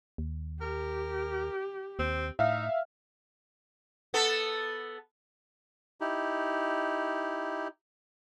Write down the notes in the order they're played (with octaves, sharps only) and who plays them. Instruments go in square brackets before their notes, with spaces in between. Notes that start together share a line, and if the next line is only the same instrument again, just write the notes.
[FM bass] D#2
[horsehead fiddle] G4 [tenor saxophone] A#4
[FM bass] D#2 [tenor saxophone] C4
[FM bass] A2 [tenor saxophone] D#4 [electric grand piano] E5 F5 F6
[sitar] B3 A4
[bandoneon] D#4 E4 G4